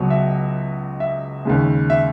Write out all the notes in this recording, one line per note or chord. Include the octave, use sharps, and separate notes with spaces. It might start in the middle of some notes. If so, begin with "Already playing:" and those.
Already playing: C#2 B2 F#3
E5
E5
D#2 C#3 G#3
E5